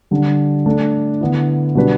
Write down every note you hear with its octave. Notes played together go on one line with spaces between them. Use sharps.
D3 G3 D4
A3 D4 A4
D3 B3 E4
B2 G3 D4 B4